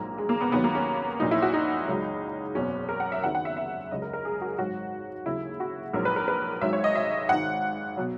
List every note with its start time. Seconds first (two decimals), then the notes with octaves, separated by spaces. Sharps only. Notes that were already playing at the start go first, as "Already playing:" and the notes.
Already playing: A#1 G#2 F#3 A#3
0.18 G#3
0.29 A#3
0.41 B3
0.52 D#2 D#3 F#3 B3
0.64 A#3
0.75 C#4
1.19 A#1 A#2 F#3 D#4
1.31 E4
1.42 F#4
1.53 D#4
1.88 C#2 C#3 F#3
2.55 F#1 E2 B2 C#4
2.89 A#4
3.00 F#5
3.12 E5
3.23 F#1 E2 D#3 F#3 F#5
3.35 F#5
3.45 E5
3.57 E5
3.91 C#2 C#3 F#3 D#5
4.02 A#4
4.13 A#4
4.25 G#4
4.41 F#4
4.58 G#1 G#2 F#3 F#4
5.26 D#2 C#3 F#3 E4
5.60 F#4
5.94 A#1 G#2 F#3 A#4
6.05 B4
6.16 A#4
6.28 B4
6.61 G#1 G#2 F#3 E5
6.73 C#5
6.84 D#5
6.95 E5
7.29 G#1 G#2 D#3 F#5
7.97 B2 F#3